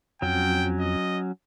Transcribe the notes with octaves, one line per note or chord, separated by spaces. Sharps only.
F2 F#3 C#4 G5
D#5